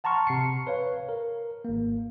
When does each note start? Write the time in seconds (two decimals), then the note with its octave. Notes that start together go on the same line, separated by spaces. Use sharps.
0.04 F#5 A5 A#5 C6 C#6 F6
0.27 C3 C7 C#7
0.67 B4 C#5 F5
1.09 A#4
1.65 G#1 A#3